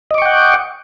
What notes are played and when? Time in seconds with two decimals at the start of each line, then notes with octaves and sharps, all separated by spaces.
0.11 D#5
0.14 D6
0.18 C#6
0.22 G5
0.26 F#5